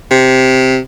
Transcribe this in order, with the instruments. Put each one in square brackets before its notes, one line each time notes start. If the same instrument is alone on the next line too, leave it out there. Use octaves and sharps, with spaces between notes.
[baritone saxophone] C3